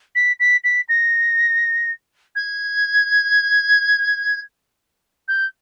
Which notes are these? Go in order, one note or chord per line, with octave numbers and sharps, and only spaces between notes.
B6
B6
B6
A#6
G#6
G6